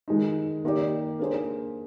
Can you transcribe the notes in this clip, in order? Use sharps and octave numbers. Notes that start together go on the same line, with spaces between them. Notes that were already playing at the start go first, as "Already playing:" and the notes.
D#3 G#3 D#4
D#3 A#3 D#4 G4 D5
A#3 D4 G#4 C5